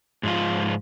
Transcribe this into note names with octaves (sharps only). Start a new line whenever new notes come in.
G#2 F3 F4